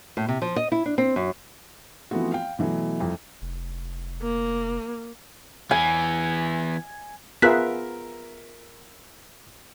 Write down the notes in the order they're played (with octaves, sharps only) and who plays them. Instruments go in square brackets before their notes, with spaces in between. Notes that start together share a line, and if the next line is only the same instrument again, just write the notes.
[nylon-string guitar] A2
C3
F3
D#5
E4
D4
C4
F#2
[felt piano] E3 F3 A3 B3 C4 F#4
F5 G5
B2 E3 F#3 A3
C2 F2
[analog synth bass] F1
[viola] A#3
[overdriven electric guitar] E3 B3 [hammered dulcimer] G#5
[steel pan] B3 F4 G#4 [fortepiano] A#4 E5 [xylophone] F#6 B6